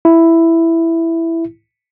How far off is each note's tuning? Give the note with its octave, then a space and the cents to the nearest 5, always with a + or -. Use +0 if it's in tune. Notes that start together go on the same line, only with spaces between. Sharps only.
E4 +5